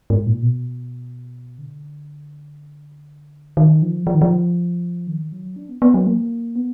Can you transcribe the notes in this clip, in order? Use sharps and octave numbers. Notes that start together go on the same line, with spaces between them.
G#2
A#2
B2
D3
D#3
F3
F3
D#3
F3
D#3
F#3
D4
B3
B3
F#3
A#3
B3